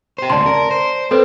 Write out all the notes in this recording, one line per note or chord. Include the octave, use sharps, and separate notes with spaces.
G4 C5
D2 C#3 D5 A5 C6
A#4
C5
C4 A4 B4 C5